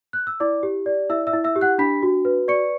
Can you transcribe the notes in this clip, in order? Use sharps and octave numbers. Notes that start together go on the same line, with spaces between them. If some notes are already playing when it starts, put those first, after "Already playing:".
F#6
E6
E4 D5 D6
G4
D5
E4 E5 E6
E5 E6
E4
E5 E6
G4
F#5 F#6
D4 B5 B6
F#4
B4
D5 C#6 C#7